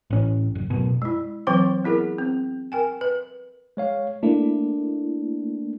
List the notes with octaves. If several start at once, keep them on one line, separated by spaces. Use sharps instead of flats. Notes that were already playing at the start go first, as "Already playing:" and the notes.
A1 C#4
F#1
F#2 B2
G#3 E4
E3 F#3 C4 C5 G5 C#6
B3 E4 G#4 A#4
C4
A#4 G5 G#5
B4
G#3 C#5 F5
A3 A#3 D4 E4